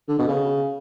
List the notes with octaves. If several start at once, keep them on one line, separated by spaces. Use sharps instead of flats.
D3
B2
C#3